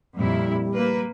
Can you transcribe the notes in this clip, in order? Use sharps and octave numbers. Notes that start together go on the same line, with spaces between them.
F2 A#2 G3 E4
A#3 B4